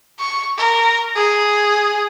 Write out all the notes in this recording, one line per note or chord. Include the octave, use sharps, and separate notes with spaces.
C#6
A#4
G#4